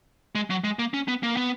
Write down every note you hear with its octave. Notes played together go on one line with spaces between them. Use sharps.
G#3
F#3
G#3
A#3
C#4
B3
A#3
B3